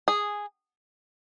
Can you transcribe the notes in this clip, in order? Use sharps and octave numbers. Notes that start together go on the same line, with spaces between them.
G#4